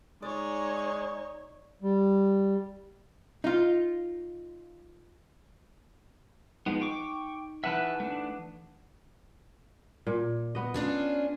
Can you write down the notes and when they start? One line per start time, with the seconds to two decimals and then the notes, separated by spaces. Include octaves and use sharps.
0.23 G#3 D#4 C#5 D5
1.82 G3
3.44 D#4 F4
6.66 F3 G#3 B3 D#4
6.81 G5 C#6 D6
7.64 E3 B4 E5 F#5 A5
8.00 A3 D4
10.07 A#2
10.55 B3 D#5
10.74 C#4 D4 F4